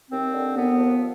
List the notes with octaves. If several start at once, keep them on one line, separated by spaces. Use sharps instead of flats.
D#2 C4
D3
D#2 B3
F3